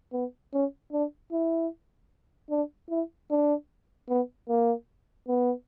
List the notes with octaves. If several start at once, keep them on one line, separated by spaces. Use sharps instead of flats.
B3
C#4
D4
E4
D4
E4
D4
B3
A#3
B3